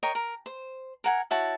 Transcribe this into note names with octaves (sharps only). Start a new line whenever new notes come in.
A#4 C#5 D#5 G5
A#4
C5
A#4 F#5 G#5
E4 F#4 C#5 A5